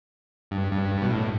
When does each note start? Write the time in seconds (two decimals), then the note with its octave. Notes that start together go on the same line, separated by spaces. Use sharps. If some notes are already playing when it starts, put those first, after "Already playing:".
0.51 G2
0.72 G2
1.02 B2
1.11 A2